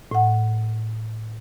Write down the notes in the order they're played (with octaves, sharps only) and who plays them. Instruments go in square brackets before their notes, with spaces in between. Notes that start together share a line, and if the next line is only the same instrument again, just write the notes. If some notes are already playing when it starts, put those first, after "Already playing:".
[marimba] A2 F#5